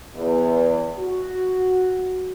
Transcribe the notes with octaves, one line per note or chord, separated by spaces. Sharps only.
E2
F#4